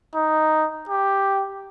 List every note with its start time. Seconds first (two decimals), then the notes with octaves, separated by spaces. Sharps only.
0.15 D#4
0.89 G4